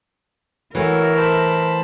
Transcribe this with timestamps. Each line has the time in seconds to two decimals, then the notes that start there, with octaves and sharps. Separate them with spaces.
0.75 E3 A3 F#4 A#4 C#5 E5
1.17 C5 A5 B5